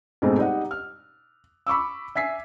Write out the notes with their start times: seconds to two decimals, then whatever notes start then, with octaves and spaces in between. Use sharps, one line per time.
0.22 G#2 B2 G#3 A3 C4 D#4
0.37 G3 D#4 D#5 F#5
0.71 F6
1.67 B5 C#6 D6 E6
2.15 E5 G#5 B6 C7